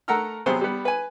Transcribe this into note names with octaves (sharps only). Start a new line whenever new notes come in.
A3 A#4 F#5 A#5 E6 F6
C3 F#3 B3 G#4 C5
G3 B3
B4 G#5